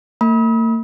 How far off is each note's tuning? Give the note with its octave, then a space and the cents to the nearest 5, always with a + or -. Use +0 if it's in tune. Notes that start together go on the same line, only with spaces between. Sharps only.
A#3 -45 B5 -30 D#6 +45